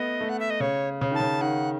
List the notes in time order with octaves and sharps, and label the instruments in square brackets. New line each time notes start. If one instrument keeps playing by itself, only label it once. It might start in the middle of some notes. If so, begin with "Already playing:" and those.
Already playing: [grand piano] A3 B3 [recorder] D#5
[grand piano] A3
[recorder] F#5
E5
D#5
[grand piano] C#3 [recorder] C#5
[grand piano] C#3
[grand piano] D#3 [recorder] A5
[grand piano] C#3
[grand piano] D#3 [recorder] F#5